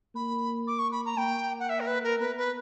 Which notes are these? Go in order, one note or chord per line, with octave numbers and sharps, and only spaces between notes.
A#3 B5
D6
C#6
B5
A#5
A#3 G5
F#5
E5
A#4
B4
A#4
B3 B4
B4